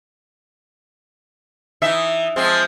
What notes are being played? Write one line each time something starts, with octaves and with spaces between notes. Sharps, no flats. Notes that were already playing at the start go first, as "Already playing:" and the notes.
E3 D#4 E5
F3 G#3 C4